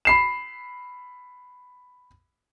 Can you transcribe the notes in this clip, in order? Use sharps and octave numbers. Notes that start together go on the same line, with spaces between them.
B5 C7 E7